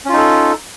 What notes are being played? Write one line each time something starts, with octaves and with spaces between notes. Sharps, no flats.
C#4 D#4 F4 A4